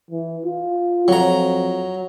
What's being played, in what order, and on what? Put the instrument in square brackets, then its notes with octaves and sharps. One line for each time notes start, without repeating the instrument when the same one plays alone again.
[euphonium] E3
F4
[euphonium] F2 [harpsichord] F#3 A#5